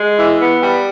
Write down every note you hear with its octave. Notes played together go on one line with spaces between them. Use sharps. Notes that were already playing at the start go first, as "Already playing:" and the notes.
Already playing: G#3
E3
B3
G3